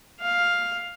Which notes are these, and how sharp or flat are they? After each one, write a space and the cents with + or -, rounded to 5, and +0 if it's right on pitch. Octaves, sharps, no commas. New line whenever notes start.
F5 +5